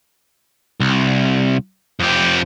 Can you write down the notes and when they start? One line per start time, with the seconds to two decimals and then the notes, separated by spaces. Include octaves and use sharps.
0.80 C2
2.00 F2 G4